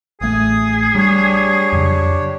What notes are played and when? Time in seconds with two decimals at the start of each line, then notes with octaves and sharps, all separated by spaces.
0.21 A1 A3 G#4 G#5 D#6
0.95 G3 D4 G4 C#5
1.73 F2 C#3 F#3